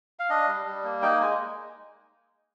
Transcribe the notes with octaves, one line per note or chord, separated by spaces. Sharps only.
F5
D4 D#5
G3
G3
A#3
D#4 G5
G#3 G#5